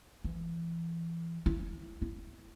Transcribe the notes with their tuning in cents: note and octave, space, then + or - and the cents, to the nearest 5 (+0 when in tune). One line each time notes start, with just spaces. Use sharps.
E3 +25
E4 +20
E4 +20